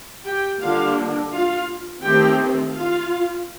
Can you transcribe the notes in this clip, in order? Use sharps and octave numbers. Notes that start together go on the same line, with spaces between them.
G4 G5
D3 G3 A#3 D4 F4 F5
F4 F5
D#3 A3 C4 G4 G5
F4 F5